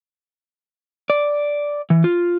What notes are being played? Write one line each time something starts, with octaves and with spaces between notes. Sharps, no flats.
D5
E3
F4